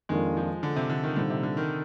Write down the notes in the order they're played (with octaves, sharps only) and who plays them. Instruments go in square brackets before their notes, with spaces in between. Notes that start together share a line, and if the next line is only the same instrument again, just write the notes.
[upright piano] F2 D#3 A#3 D4 F4 [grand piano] G#3
[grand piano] F3
D3
C3
D3
D#3
[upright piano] A#2 G3 C4 D#4 [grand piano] D3
[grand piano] C3
D3
D#3